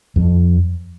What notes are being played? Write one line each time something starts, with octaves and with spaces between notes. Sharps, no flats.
F2